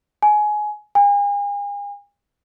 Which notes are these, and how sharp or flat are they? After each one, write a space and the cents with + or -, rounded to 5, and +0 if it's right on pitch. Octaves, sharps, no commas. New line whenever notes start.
G#5 +20
G#5 -40